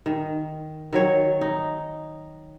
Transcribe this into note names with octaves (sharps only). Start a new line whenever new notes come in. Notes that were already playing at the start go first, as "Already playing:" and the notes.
D#3
D#3 F#3 C#5
D#4